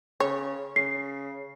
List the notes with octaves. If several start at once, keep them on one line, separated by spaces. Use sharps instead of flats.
C#3 C#5
C#3 C7